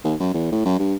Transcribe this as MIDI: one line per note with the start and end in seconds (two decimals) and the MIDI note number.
0.04 0.14 39
0.20 0.30 42
0.34 0.51 40
0.52 0.64 45
0.65 0.75 42
0.79 0.95 43